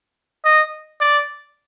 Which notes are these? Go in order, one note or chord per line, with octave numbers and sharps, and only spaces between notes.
D#5
D5